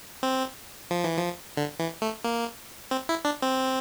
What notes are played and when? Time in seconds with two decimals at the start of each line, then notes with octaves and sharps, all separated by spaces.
0.23 C4
0.91 F3
1.04 E3
1.17 F3
1.57 D3
1.79 E3
2.02 A3
2.24 A#3
2.91 C4
3.09 E4
3.25 D4
3.42 C4